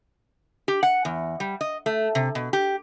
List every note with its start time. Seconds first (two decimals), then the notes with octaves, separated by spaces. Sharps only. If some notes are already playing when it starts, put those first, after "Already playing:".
0.68 G4
0.83 F#5
1.05 E2
1.40 G3
1.61 D#5
1.86 A3
2.15 C3
2.35 B2
2.53 G4